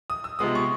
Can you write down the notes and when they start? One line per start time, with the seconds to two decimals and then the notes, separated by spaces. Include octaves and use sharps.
0.10 D#6
0.24 E6
0.39 C3 F3 G#3 B3 D#6
0.55 C#6